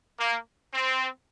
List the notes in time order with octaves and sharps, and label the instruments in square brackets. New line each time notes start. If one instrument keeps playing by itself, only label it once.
[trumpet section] A#3
C4